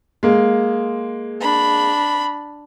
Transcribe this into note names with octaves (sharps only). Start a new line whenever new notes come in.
G#3 A#3
D4 B5